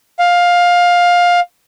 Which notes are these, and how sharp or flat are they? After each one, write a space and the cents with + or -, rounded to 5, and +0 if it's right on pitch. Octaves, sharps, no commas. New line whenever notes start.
F5 +15